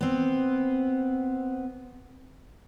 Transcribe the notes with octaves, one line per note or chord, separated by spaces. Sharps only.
B3 C4